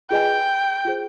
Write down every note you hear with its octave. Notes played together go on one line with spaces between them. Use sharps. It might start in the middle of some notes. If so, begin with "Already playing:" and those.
F4 G#4 B4 D#5 G5 G#5
F4 G#4 C5